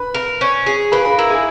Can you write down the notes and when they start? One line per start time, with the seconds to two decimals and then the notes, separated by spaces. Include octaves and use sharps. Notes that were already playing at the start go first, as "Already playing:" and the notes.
Already playing: B4 B5
0.14 A#4
0.41 C#4
0.66 G#4
0.92 A#3 B4 B5
1.05 B4 B5
1.18 E4 A#4 A#5
1.30 G#4 G#5